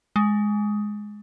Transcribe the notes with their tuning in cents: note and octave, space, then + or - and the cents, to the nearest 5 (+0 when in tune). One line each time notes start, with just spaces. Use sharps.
G#3 +5